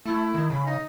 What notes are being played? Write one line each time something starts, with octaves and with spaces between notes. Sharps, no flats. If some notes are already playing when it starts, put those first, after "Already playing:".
A3 E4
D#3
C#3 B5
D#4